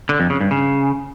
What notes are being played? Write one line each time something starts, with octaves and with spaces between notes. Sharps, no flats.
D3
F2
C#3
G2
C#3